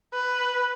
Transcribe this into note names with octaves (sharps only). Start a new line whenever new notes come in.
B4